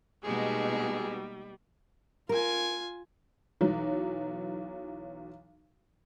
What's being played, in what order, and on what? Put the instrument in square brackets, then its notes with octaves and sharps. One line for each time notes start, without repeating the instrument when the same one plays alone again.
[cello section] B2 D#4 F#4 [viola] G3 [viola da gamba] G#3 A#3 [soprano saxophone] G#4
[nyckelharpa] F4 G#5 [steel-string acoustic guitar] A#4
[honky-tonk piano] B1 E3 F#3